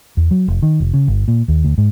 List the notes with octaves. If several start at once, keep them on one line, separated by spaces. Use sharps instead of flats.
E2
F#3
F1
D#3
F1
C#3
G1
A#2
D#2
D2
G#2